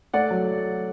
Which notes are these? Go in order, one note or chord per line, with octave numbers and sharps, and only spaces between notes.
A3 D5 F#5
F#3